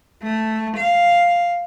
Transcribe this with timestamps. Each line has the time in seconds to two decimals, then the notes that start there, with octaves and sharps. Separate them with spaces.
0.23 A3
0.77 F5